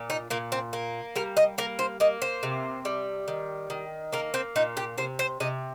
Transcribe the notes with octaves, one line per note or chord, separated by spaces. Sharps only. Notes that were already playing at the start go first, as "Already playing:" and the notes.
Already playing: A#2
D#4
A#2 A#3
C4
A#3
G3 A#4
D#5
A#3 A#4
C5
A#3 D#5
C5
C3
G3
D#3
D#3
A#3 A#4
C4
A#2 D#4
G4
C3 C5
C5
C3 D#5